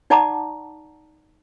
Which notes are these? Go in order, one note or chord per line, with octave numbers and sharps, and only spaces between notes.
D#4 D5 F#5 A5 A#5 D6